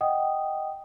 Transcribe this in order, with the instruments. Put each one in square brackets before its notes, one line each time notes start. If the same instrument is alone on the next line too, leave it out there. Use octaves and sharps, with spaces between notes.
[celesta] D#5 F#5 G5 D#6